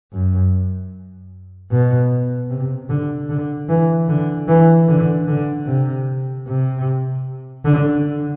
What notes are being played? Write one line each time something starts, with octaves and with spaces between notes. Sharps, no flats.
F#2
B2
C3
D3
D3
E3
D3
E3
D3
D3
C3
C3
D3